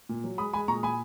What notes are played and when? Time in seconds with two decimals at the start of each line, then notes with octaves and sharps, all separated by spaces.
0.09 A#2
0.24 F#3
0.38 G#3 B5 D#6
0.53 G#3 G#5 B5
0.68 A#2 A#5 C#6
0.83 A#2 G#5 B5